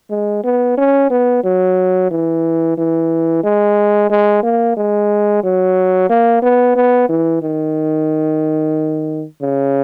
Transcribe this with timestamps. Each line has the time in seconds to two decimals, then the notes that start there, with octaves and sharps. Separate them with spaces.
0.11 G#3
0.44 B3
0.78 C#4
1.11 B3
1.44 F#3
2.11 E3
2.77 E3
3.44 G#3
4.10 G#3
4.43 A#3
4.77 G#3
5.44 F#3
6.10 A#3
6.42 B3
6.76 B3
7.09 E3
7.42 D#3
9.42 C#3